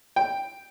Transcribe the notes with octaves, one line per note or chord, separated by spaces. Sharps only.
G5